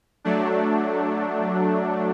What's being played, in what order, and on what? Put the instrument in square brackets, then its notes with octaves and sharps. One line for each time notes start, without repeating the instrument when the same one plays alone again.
[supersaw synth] F#3 A3 D4